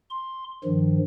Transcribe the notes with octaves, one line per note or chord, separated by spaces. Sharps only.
C6
G2 D#3 F3